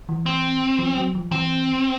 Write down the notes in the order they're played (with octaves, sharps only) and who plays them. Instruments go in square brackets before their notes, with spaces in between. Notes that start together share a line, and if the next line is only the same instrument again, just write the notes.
[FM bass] E3
[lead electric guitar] C4
[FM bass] F3
F#3
F3
[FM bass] E3 [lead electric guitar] C4